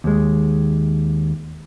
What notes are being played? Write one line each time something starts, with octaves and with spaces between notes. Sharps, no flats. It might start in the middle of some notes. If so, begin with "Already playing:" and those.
D#2 G#3